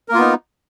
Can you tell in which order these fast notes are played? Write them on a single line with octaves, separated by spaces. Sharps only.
A#4 A#3 F4 B3 D#4